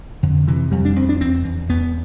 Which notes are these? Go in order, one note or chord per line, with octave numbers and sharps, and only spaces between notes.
F2 D3
C3 E3
F2 G3
D4
F2 C4
D4
E2 C4
E2
E2 B3